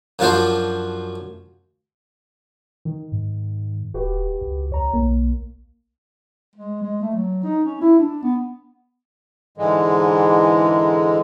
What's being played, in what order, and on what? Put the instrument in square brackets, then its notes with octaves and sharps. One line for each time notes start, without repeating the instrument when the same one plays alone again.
[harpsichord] F#2 F3 D4 F4 F#4 C5
[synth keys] D#3
[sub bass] G#2
[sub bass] D#1 [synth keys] F#4 G4 B4
[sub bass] C#2
[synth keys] D#2 C#5 A#5
[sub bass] B1 [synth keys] A#3
[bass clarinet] G#3
G#3
A3
F#3
D#4
C#4
E4
D4
B3
[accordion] G#2 D3 E3 G#3